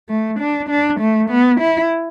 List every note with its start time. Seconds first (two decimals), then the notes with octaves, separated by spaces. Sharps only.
0.09 A3
0.40 D4
0.69 D4
1.00 A3
1.30 B3
1.61 E4